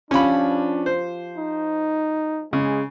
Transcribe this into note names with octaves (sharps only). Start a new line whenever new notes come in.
F3 C#4 D4 G4 B5
C5
D#4
C#3 G#3